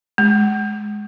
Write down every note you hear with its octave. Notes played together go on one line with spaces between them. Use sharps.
G#3